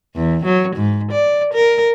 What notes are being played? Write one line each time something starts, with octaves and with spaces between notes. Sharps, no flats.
E2
F#3
G#2
D5
A#4